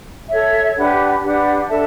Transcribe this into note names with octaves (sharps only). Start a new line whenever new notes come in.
A4 C#5 E5
D4 G4 B4 F#5
D4 G4 B4 F#5
D4 A4 E5 A5